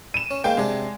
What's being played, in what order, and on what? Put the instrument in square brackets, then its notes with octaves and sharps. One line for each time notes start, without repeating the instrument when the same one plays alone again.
[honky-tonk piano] D#7 E7
[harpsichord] C#4
[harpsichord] G#2 G#3 A#3 [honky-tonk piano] G5
[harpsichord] C3 D4 [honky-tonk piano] G#3